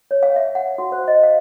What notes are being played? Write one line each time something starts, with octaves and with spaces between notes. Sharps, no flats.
C#5
F5
E5
F#5
F#4
C5
D#5
F5